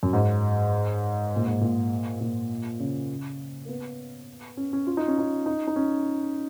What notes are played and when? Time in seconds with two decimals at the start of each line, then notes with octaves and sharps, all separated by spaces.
0.03 F#2
0.13 G#2
1.36 A#2
1.47 G#2
1.61 A#2
2.21 A#2
2.80 C#3
3.65 A#3
3.69 B3
4.57 C#4
4.73 C#4
4.87 F4
4.97 D#4
5.08 C#4
5.18 D#4
5.46 D#4
5.67 D#4
5.76 C#4